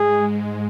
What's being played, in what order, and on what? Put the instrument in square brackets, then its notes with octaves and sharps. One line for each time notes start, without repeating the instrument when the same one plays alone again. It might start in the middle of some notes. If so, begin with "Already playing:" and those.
Already playing: [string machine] G#2 G#3 [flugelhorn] G#4